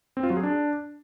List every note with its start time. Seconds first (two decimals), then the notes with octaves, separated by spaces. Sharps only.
0.17 C4
0.23 F4
0.30 F#3
0.37 G#4
0.43 D4